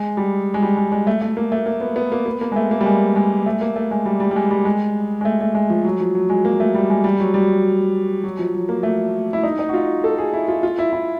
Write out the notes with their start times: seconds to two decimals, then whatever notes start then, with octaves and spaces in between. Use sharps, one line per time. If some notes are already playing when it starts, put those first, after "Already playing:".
Already playing: G#3
0.17 G3
0.54 G#3
0.62 G3
0.77 G#3
0.92 G#3
1.07 A3
1.22 A3
1.37 A#3
1.52 A3
1.66 A#3
1.81 B3
1.96 B3
2.12 A#3
2.26 B3
2.41 A#3
2.52 G#3
2.56 A3
2.71 A#3
2.81 G3
2.86 G#3
3.16 G#3
3.46 A3
3.61 A#3
3.76 A3
3.91 G#3
4.06 G3
4.20 G3
4.31 G3
4.36 G#3
4.51 G3
4.65 G#3
5.21 G#3
5.25 A3
5.41 A3
5.55 G#3
5.70 F3
5.85 F#3
6.00 F3
6.15 F#3
6.30 G#3
6.45 A#3
6.60 A3
6.74 G3
6.90 G#3
7.04 G3
7.20 F#3
7.34 G3
8.24 F#3
8.39 F3
8.54 F#3
8.69 A#3
8.83 A3
9.33 E4
9.43 D#4
9.59 D#4
9.69 F#4
9.74 F4
10.04 A4
10.18 G#4
10.33 E4
10.48 F4
10.63 F4
10.79 E4
10.93 E4